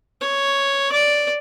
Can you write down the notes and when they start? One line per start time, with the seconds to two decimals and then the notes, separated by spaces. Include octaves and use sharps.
0.21 C#5
0.92 D5